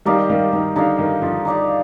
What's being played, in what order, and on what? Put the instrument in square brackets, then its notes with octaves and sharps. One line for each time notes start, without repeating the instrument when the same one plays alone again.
[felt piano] D#3 G3 [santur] D#4 G4 D5 F5
[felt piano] D#3 G3
D#3
[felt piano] D3 [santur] D#4 G4 D5 F5
[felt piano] D#3
D3 F3
[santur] D#4 G4 D5 F5